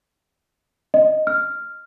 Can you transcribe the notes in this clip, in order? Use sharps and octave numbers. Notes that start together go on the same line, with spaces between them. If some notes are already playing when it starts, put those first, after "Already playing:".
D#5
F6